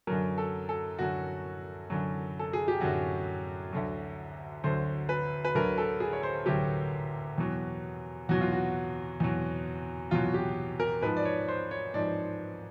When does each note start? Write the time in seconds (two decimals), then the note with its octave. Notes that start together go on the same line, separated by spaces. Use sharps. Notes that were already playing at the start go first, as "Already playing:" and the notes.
0.07 F#2 D3 F#3 A#4
0.38 A4
0.69 A4
0.99 F#2 D3 F#3 F#4
1.90 F#2 D3 F#3
2.39 A4
2.53 G#4
2.68 G4
2.81 F#2 D3 F#3 F#4
3.73 D2 D3 F#3
4.64 D2 D3 F#3 C5
5.09 B4
5.45 B4
5.55 D2 D3 F#3 A#4
5.78 A4
6.00 G#4
6.13 C#5
6.23 C5
6.46 D2 D3 F#3 G4
7.38 E2 B2 F#3
8.29 E2 B2 F#3 F#4
8.41 F4
8.52 F#4
9.20 E2 B2 F#3
10.11 E2 B2 F#3 F4
10.34 G4
10.80 A#4
11.02 G#2 F3 B4
11.17 D5
11.25 C#5
11.48 C5
11.71 C#5
11.94 G#2 F3 D5